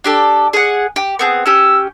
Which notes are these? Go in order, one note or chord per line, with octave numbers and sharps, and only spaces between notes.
D4 G4 A4
G#4 F#5
G4
B3 C4 G#4
C#4 G4 E6